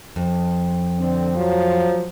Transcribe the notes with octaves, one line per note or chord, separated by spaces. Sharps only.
F2
D3 C4
F3 F#3